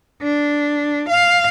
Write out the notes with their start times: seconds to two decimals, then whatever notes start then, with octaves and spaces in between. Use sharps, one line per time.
0.23 D4
1.09 F5